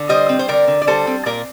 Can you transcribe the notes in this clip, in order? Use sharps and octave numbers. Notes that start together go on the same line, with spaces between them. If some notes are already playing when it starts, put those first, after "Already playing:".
Already playing: D3
G3 C5 D#5
C4
C5
D3 A#4 D5
D3
D5
G3 A4 C5
C4
A#2 A#4 D5